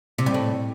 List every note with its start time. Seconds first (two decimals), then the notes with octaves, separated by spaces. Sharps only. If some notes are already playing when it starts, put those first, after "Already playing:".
0.18 C3
0.26 G3
0.34 A2